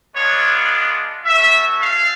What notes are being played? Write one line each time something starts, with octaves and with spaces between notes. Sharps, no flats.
G#3 B3 D4 F4 C#5
A3 C#4 F#4 E5
F5